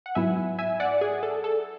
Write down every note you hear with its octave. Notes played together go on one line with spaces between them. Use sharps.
F#5
G#2 F#3 B3 E4 E5 G#5
E5 G#5
D5 F#5
G#4
A4
A4